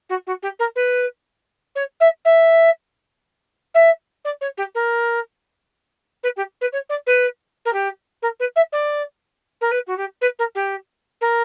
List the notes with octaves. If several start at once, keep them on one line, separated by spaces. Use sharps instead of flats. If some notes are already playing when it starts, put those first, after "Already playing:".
F#4
F#4
G4
A#4
B4
C#5
E5
E5
E5
D5
C#5
G4
A#4
B4
G4
B4
C#5
D5
B4
A#4
G4
A#4
B4
E5
D5
A#4
B4
F#4
G4
B4
A#4
G4
A#4